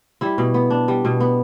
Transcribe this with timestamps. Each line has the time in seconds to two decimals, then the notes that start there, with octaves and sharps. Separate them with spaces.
0.21 G3 E4
0.38 B2
0.54 B3
0.70 D4
0.88 G3
1.05 B2
1.20 B3